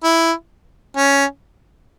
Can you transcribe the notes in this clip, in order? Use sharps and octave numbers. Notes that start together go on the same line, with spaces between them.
E4
C#4